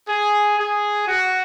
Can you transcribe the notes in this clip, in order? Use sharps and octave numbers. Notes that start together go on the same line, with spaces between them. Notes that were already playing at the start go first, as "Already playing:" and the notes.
G#4
G#4
F#4